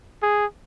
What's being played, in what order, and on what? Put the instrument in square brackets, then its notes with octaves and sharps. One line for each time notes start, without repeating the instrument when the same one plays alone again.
[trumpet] G#4